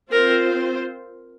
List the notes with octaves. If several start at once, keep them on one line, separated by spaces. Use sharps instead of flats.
C4 F4 A#4 C5